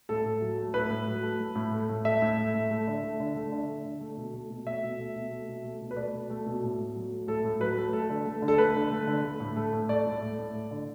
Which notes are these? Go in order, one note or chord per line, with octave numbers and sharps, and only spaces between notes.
A2 A4
A2
F#3
A3
A2 B4
A2
F#3
A3
A3
A2
A3
A2
A3 E5
A2
A3
A2
A3
D3
A3
D3
A3
D3
A3
D3
A3
B2
A3
B2
A3 E5
B2
A3
B2
A3
B2
A3
B2
B4
A3 D5
B2
A3
B2
A2
A2
F#3
A3
A2 A4
A2
F#3 B4
A3
A3 A4
D3
A3
D3
A4
A3 B4
D3
A3
D3
A3
A2
A3
A2
A3 D5
A2
A3
A2
A3
D3